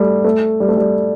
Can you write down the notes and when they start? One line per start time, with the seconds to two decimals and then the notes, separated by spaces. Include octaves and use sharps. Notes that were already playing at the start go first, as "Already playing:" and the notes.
Already playing: G3 A3
0.24 A3
0.60 G3
0.68 A3
0.77 G3